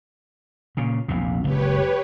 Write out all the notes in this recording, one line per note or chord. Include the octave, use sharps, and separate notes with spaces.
A#2 C#3
A#1 E2 C3
F#1 C#2 G4 B4 C#5